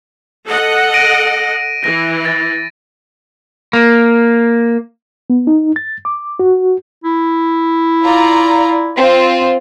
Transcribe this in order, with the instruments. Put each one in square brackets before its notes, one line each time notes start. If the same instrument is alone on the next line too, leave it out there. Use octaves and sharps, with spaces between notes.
[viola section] A4 D#5 F#5
[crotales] A#6 D7 D#7
[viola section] E3 [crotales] A#6
[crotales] A6
[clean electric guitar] A#3
[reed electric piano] B3
D#4
A6
D6
F#4
[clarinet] E4
[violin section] F4 D5 A#5
C4 F4